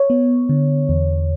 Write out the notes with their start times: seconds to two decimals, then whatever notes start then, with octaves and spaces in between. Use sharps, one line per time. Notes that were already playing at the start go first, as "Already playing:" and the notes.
Already playing: C#5
0.10 B3
0.49 D3
0.89 E2